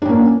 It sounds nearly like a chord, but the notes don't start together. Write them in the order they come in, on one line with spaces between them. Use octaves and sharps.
D4 C#4 A#3